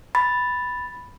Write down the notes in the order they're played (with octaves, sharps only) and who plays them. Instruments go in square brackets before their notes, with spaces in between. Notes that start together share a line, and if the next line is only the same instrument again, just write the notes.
[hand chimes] B5 A6